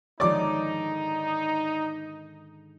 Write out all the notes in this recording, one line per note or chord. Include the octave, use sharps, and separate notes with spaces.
G#2 D3 D#3 F3 D#4 C#5 D5 D6